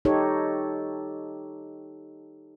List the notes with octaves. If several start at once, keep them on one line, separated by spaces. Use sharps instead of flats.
D#4 G4 A4 C#5